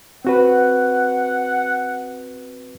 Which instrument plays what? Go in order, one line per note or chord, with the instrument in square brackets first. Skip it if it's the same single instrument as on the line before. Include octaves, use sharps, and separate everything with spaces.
[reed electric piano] C4 F#4 B4 [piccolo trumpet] F#5